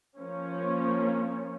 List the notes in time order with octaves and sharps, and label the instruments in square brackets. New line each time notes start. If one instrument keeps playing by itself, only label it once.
[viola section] F3 A#3 C#4